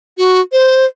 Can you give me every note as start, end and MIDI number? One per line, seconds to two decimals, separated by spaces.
0.18 0.41 66
0.52 0.86 72